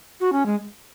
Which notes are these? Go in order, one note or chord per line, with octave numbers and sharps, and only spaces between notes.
F#4
C#4
G#3